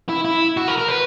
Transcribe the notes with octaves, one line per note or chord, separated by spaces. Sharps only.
E4
E4
F#4
A#4
A#4
B4